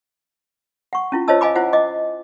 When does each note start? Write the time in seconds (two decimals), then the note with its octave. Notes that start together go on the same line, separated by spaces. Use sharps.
0.93 F#5 C#6
1.12 C#4 E4 F4
1.28 F4 C5 C#5 D#5 A5 E6
1.41 D#5 F5 G#5 B5 D6
1.56 E4 F4 C5 F#5
1.73 D#5 D6